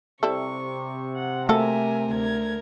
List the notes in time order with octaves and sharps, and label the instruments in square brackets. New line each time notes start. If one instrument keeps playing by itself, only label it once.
[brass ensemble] C3 [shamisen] G3 E4 A4 [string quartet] C#6
[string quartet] F#5
[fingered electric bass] A3 [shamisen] A#3 F#4 A4 [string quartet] A#4 E5 G#5
[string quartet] D2 A#4 G#6